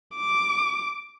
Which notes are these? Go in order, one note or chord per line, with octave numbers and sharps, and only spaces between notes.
D6